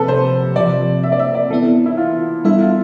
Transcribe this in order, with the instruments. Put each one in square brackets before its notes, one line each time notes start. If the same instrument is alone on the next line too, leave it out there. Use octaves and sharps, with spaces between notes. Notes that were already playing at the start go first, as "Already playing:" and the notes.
Already playing: [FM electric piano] C3 F3 C4 G4 [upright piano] A4 B4
[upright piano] C5
[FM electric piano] C3 F3 C4 [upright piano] D5
[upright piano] E5
D5
E5
D5
[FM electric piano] E3 B3 E4 [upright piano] A4
[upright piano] E4
F4
[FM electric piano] G3 B3 D4 A4 [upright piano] E4
[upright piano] F4